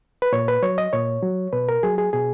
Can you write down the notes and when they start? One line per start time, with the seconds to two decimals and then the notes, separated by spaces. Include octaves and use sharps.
0.22 B4
0.32 A#2 C#5
0.48 B4
0.63 F#3 C#5
0.78 D#5
0.93 A#2 C#5
1.23 F#3
1.53 B2 B4
1.69 A#4
1.83 F#3 G#4
1.98 G#4
2.13 B2 G#4